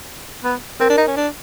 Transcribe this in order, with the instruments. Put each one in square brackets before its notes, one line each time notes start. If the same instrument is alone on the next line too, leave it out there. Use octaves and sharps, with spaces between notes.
[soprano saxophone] B3
[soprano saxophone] C4 [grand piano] A#4
[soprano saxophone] D4
D#4
C#4
D4